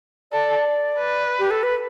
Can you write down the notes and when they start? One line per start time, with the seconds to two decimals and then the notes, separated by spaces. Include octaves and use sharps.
0.32 A4 D5
0.98 B4
1.39 G4
1.51 A4
1.63 B4